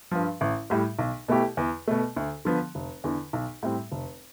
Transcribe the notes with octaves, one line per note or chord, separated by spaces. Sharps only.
G2 F3
A1
A2 G3
B1
B2 A3 E4 G4
E2
B2 A3
D2
D3 F3 B3
F1
E2 D3
B1
A2 G3 C4
F1